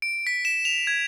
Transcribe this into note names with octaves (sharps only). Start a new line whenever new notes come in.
D7
B6
E7
F7
G#6